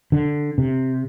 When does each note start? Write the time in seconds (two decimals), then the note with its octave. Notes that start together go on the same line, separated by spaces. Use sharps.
0.12 D3
0.58 C3